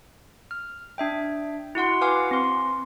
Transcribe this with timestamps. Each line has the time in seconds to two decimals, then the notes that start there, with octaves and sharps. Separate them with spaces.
0.51 F6
0.98 D4 E5 G5
1.75 E4 F#4 F#5 C6
2.01 B4 F5 F#5 G#5 D6 F6
2.31 C4 C6